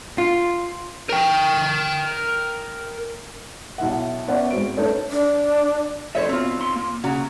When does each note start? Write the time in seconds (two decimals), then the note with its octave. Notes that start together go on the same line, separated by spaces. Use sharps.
0.18 F4
1.09 A#4 G5
3.78 B1 E4 E5 F#5
4.28 B3 C#4 D5 E5 F#5
4.51 G#2 C4 F#4 D7
4.77 A3 C#4 D#4 A4 B4 C#5
5.11 D4
6.15 F2 F3 A3 C5 C#5 E5
6.29 F#2 B2 C4 F4
6.58 D#2 C6
6.76 A#3
7.04 C#3 F#3 F#4